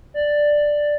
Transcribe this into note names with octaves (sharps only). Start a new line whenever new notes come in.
D5